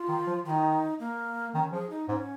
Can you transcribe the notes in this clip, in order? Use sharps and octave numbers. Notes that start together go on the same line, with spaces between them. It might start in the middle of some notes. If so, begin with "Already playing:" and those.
Already playing: F4
D#3
F3
D#3 D#4 F4
A#3
D#3 C#4
F3 G#4
D#4
G#2 C#4